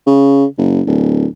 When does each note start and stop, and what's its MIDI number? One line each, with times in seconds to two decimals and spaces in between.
0.06 0.45 49
0.57 0.81 30
0.87 1.26 26